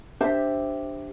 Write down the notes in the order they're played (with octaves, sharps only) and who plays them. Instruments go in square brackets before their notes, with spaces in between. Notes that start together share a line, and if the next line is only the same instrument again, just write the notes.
[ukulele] D4 G4 C5 E5